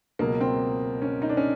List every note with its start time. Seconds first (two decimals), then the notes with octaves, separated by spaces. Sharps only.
0.19 C#2 B2 F#3 A#3
0.41 C4
1.02 C#4
1.22 D#4
1.29 D4
1.37 C#4